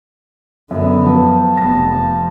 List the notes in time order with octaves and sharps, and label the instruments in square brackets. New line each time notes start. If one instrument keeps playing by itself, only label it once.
[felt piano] F#2 [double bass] D3 B3
[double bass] F3 [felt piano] F#3 B4 [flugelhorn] A5
[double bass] F1 B3 [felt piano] A#6
[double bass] F3